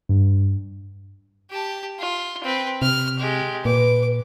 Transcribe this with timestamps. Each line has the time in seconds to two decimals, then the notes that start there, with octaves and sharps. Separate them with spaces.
0.09 G2
1.50 G4 A5
1.99 F4
2.44 C4 B4
2.82 C3 F6
3.19 G#3 G4
3.65 A#2 B4 D6